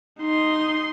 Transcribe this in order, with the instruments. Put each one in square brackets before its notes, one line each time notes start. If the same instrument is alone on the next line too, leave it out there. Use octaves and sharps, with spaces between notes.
[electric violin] D#4 C6